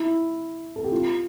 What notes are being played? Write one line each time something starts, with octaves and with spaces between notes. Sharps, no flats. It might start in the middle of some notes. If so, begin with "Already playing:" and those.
Already playing: E4
A4
G4
F4